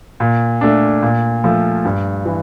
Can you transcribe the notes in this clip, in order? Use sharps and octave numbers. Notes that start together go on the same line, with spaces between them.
A#2
A3 D4
A#2
F3 A3
G2
E3